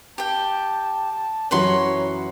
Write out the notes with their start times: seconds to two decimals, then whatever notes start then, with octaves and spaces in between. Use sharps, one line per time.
0.18 G4 G5 A5
1.51 F#2 E3 F#3 B4 C#5 F#5 C6